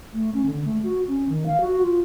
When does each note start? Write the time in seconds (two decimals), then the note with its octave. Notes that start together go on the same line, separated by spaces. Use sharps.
0.13 A3
0.34 C#4
0.45 D3
0.65 A3
0.83 F#4
1.08 C#4
1.29 D#3
1.46 F5
1.61 F#4
1.82 F4